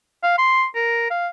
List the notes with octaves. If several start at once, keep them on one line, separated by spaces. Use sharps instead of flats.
F5
C6
A#4
F5